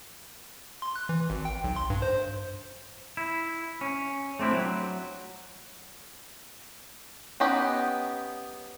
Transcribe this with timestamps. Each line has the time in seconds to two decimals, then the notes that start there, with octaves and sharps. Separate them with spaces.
0.82 C6
0.96 F#6
1.09 E3
1.30 G#1
1.45 G5
1.64 B1
1.76 C6
1.90 G2
2.02 C5
3.17 E4
3.81 C#4
4.39 A3 C4 D4 E4
4.53 F#3
7.40 B3 C#4 D#4 G4 B4